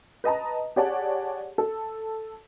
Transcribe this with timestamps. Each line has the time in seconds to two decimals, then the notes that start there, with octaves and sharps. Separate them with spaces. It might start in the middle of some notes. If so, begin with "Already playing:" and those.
0.24 B4 D#5 A5 A#5
0.76 G4 G#4 C#5 D5 F#5 A5
1.58 A4